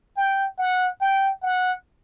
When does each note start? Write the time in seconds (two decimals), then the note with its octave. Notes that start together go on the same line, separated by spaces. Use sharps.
0.17 G5
0.59 F#5
1.01 G5
1.43 F#5